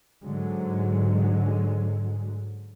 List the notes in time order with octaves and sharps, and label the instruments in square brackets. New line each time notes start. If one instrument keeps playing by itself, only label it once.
[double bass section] G#2 D3 F#3 G#3